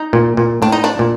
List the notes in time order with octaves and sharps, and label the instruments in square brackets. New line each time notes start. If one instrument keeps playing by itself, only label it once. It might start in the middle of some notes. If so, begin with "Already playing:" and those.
Already playing: [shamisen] D#4
[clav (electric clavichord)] A#2
A#2
[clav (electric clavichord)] A2 [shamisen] D4
[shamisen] D#4
D4
[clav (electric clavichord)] A#2